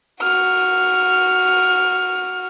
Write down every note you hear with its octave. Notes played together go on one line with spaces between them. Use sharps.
F#4 F6